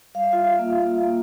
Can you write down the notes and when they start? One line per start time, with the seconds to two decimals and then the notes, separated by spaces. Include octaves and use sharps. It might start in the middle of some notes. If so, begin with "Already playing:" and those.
0.15 G3 F5
0.23 E5
0.32 F4 F5
0.59 A#3
1.03 A#3